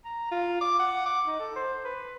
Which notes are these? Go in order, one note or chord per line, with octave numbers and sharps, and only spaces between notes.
A#5
F4
D6
F#5
D6
D#4
A4
C5
B4